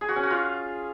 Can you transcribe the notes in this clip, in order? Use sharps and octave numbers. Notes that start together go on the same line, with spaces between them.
G#4
F#4
C#4
F#4
F4